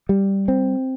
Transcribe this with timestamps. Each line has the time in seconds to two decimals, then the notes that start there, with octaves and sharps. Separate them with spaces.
0.09 G3
0.48 C4